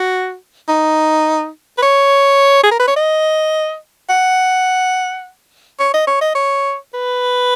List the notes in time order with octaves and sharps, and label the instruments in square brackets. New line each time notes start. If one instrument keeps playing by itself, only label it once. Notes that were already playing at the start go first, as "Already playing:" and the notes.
Already playing: [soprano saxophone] F#4
D#4
B4
C#5
G#4
A#4
B4
C#5
D#5
F#5
C#5
D#5
C#5
D#5
C#5
B4